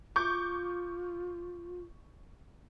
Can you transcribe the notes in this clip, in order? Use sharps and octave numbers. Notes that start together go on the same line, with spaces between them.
F4 C#6 D6 G6